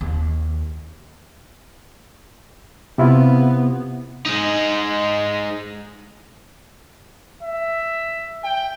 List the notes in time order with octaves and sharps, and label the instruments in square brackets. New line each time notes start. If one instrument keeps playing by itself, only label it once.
[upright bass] D#2
[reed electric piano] C3 E4 F4 [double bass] B3
[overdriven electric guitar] G#3 D#4
[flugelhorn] E5
G5